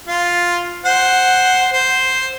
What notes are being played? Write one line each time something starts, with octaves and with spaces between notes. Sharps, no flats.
F4
C5 F#5
C5